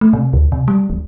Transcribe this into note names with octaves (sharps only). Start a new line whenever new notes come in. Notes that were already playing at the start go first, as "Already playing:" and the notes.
A3
C3
D2
C3
G3
D1